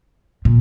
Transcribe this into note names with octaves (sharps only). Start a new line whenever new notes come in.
A#2